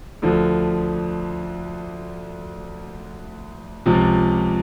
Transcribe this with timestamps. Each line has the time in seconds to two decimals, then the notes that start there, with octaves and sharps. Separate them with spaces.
0.22 D2 D3 F3
3.86 C#2 C3 F3